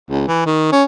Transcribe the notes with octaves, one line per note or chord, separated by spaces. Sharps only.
C#2
E3
D#3
C#4